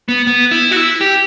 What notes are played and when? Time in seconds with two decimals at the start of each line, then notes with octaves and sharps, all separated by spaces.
0.08 B3
0.27 B3
0.51 E4
0.71 F#4
0.77 E4
1.01 G4